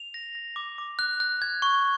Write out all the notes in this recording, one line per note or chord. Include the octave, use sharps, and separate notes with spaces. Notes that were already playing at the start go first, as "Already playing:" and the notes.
Already playing: F7
A#6
A#6
D6
D6
F#6
F#6
G#6
C#6